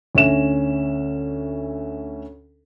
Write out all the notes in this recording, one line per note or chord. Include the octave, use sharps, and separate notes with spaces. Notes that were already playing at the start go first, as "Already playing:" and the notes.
D2 C#4 E5 E7